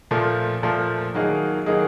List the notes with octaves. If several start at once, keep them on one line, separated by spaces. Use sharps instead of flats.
A#2 F3 A3
A#2 F3 A3
D#3 F#3 A#3 D#4 G#4
D#3 F#3 A#3 D#4 G#4